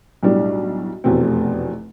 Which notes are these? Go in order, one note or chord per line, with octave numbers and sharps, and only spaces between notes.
B1 A2 G3 D4
F1 E2 B2 A3 C4